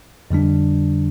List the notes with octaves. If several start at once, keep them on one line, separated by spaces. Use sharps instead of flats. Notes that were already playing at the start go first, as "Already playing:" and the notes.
F2 D3 G3 D4